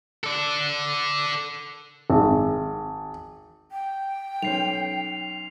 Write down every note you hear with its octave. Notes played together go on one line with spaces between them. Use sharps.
A4 D5
G#1
G5
B1 C#4 C7 F7